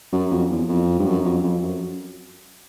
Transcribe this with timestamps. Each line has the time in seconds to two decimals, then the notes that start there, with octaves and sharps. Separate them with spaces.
0.13 F#2
0.31 F2
0.50 E2
0.69 F2
0.99 G2
1.06 F#2
1.25 F2
1.43 F2
1.62 F#2